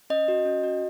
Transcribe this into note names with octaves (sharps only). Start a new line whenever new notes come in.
C#4 D#5
F#4
C#4
F#4